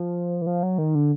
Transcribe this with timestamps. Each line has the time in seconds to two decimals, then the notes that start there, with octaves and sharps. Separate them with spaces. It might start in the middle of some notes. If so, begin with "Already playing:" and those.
Already playing: F3
0.42 E3
0.47 F3
0.63 F#3
0.78 D#3
0.95 D3